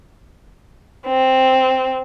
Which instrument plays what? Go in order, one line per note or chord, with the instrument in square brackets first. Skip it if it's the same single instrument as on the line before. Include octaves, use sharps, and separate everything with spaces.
[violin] C4